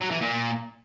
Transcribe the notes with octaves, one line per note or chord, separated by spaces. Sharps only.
F#3
E3
A#2